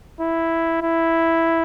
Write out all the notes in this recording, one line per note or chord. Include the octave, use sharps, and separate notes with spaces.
E4
E4